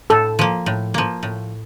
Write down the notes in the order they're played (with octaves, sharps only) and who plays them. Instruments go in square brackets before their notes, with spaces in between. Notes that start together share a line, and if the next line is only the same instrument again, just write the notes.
[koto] A2 [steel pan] A4
[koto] F3 A#3
A2
F3 A#3
A2